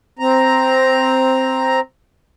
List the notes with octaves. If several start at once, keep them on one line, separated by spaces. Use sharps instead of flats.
C4 A#5